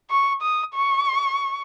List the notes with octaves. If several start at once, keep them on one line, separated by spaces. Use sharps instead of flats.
C#6
D#6
C#6